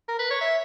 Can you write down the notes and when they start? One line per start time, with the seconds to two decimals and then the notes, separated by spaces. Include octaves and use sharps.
0.08 A#4
0.19 B4
0.30 C#5
0.41 E5